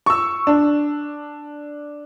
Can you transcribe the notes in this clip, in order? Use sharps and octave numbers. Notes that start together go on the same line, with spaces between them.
C#6 E6
D4